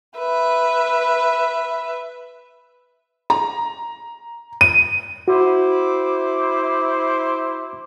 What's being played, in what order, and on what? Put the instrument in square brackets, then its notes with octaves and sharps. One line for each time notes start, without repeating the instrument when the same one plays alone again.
[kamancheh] B4 E5
[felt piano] A#5
[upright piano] D#7
[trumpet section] E4 C5 D6 [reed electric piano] F#4